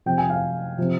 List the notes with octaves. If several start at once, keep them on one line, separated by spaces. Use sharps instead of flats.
C3 F3 G5
G#5
F5
C3 F3